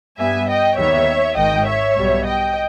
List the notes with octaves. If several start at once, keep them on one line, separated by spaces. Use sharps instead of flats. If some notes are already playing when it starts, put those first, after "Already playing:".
G2 G3 B3 E5 G#5
D#5 G5
D#2 D#3 G3 B3 C#5 E5
G#1 G#2 D#3 D#5 G5
C#5 E5
B1 B2 G3
D#5 G5